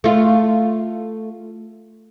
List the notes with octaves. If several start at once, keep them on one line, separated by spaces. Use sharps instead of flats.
A3 F4